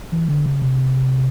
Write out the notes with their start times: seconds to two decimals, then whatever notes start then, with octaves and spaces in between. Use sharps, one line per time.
0.12 E3
0.28 D3
0.46 C#3
0.62 C3